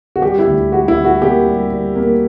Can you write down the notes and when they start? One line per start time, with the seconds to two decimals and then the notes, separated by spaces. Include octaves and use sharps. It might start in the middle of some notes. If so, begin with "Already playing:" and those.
0.16 F#4
0.22 G3 G4
0.39 E4
0.47 D2
0.71 G3 F#4
0.88 E4
0.97 G3
1.05 F#4
1.22 A#3 G4
1.47 G3
1.71 G3
1.96 A#3